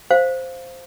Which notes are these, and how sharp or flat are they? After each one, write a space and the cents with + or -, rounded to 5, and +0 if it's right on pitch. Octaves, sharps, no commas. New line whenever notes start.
C5 +0 F5 +0